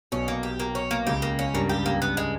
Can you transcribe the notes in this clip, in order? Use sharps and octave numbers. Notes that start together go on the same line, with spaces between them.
B1 B2 C#4
A#3
G4
A#3
C#4
A#3
C#2 C#3 G4
A#3
C#4
G2 G3 A#3
G4
A#3
B3
G#3